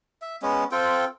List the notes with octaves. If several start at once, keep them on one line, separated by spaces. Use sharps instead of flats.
E5
G#3 B3 C#4
C4 F4 A4 G5